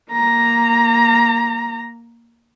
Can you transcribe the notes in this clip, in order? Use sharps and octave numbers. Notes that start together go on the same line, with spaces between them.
A#3 A#5